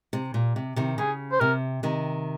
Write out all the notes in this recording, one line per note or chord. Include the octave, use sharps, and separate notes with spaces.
C3
A#2
C3
C3 D#3
C#3 G#4
C5
C3 A#4
C3 D#3